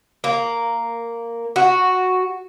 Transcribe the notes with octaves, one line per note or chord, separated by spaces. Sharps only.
A#3
F#4